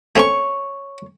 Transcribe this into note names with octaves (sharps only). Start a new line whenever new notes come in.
A3 C4 C#4 C#5 C#6